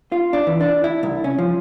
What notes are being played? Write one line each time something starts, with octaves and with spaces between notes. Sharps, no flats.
F4
D4
E3
D4
E4
C2
C#4
F3